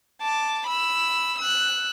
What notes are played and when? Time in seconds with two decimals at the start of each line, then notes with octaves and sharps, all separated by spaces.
0.21 A5 D6
0.67 B5 E6
1.38 E6 F#6